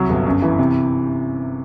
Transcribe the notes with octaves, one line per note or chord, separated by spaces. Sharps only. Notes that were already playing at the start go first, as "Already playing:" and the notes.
Already playing: C2 F#3
G1
F#2
E3
C3